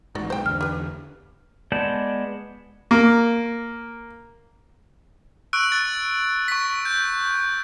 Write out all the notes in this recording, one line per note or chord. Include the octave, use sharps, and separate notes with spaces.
A1 G#2 F#4 D5
B1 G#2 C5 G5
E2 D3 D4 F6
G4 B4
G#3 B3 D5 A5 G6
A#3
C#6 E6 F#6 D7
A6
C#6 B6
G6